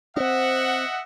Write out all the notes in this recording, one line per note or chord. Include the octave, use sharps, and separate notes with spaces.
C4 C#4 D#5 E5 F#5